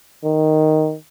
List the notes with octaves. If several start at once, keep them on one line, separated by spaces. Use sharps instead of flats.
D#3